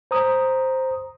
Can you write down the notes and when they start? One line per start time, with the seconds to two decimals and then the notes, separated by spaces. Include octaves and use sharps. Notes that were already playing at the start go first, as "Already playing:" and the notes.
0.11 C5 A#5 D#6